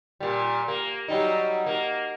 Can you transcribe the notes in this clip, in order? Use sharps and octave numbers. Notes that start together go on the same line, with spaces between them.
A#2 G3
A#3
F#3 G3 D#4
A#3